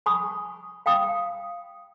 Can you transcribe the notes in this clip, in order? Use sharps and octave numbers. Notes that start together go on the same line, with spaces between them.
G#5 B5 C#6 D#6
F5 G5 B5 D#6